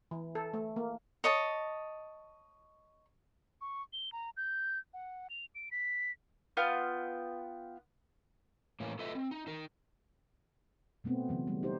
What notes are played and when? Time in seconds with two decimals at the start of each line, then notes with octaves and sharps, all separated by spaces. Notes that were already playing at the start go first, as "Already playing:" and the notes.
0.11 E3
0.35 A4
0.54 A3
0.76 A#3
1.24 C#5 D#5 A5
3.61 C#6
3.93 G7
4.12 A#5
4.37 G6
4.94 F#5
5.30 F7
5.55 D7
5.71 B6
6.57 B3 F4 G5 F6
8.80 A2 E3 A#3 C#4
8.99 F4 A4 B4 D#5 E5
9.15 C4
9.31 D#4
9.47 D#4 A#4
11.04 B2 A3 B3 C4
11.29 C#3 E3 F#3
11.47 E3 G3 A3
11.63 D#4 G4 C5